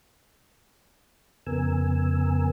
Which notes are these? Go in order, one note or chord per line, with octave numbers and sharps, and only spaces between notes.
F2 C#3 B3 A#4 G#5 E6